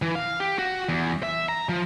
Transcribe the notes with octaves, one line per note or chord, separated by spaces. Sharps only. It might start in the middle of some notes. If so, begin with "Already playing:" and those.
E3
F5
G4
F#4
E2
E5
A#5
F3